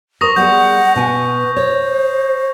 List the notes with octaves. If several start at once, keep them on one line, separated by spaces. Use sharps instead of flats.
A#4 C5 C#6 D#6 A#6
G3 B3 G#4 F#5 G6
B2 B4 G#5
C5 C#5